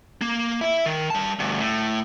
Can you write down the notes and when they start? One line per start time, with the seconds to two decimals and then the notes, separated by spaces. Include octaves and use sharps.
0.22 A#3
0.61 E4 E5
0.86 D#3
1.10 G3 A5
1.39 D2 G2
1.59 A2